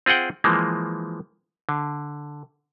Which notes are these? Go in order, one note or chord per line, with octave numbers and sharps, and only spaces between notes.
C4 F4 G#4 F#5 G5
E3 F3 G#3 A#3
D3